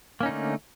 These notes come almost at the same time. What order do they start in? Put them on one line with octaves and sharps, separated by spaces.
A#3 C#4 D#4 D3 A3